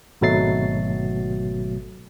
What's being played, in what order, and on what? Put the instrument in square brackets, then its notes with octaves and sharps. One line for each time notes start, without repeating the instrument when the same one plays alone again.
[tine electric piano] G#1 B2 F#3 A3 A6 C7